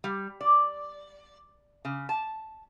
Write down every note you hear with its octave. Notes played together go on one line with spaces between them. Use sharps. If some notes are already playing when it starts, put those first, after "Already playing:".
G3
D5
C#3
A5